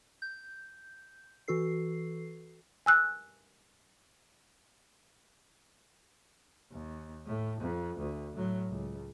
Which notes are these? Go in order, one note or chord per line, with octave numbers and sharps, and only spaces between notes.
G6
E3 F#4 A4 C7
G#5 E6 F#6
D#2
A2
F2
D2
A2 F#3
C#2